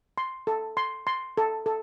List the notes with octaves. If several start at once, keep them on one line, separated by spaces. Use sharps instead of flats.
C6
A4
C6
C6
A4
A4